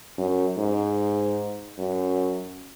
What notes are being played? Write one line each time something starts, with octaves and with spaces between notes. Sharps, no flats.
F#2
G#2
F#2